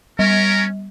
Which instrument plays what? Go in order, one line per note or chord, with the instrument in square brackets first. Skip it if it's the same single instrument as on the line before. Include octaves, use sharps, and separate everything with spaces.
[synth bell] G3 [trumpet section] C#4 A#4